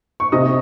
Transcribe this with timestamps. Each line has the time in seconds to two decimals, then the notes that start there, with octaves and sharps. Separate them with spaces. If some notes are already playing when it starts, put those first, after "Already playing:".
0.20 C#6
0.32 C3 D#5 D#6